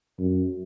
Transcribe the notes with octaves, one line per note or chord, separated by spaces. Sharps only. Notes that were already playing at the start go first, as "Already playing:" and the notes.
F#2